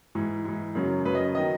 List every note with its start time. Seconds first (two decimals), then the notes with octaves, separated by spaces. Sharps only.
0.15 G#2 E3
0.45 G#2 E3
0.75 F#2 C#3 F#3
1.05 F#2 C#3 F#3 B4
1.15 D#5
1.35 D#3 F#3 D#5